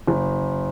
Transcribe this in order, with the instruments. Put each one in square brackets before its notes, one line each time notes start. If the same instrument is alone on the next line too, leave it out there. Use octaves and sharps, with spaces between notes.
[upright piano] F#1